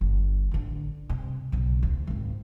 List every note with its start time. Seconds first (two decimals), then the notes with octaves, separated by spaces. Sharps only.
0.01 G1
0.51 A1 D3
1.10 G2 C3
1.52 B1 C#3
1.83 D2 C#4
2.07 G#1 C#2